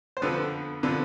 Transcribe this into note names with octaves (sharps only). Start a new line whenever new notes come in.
C5
F2 D3 F3 B3 B4
D3 F3 B3 B4